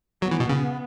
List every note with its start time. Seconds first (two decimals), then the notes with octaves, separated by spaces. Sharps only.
0.22 F#3 B3
0.31 E3
0.40 B2
0.49 C#3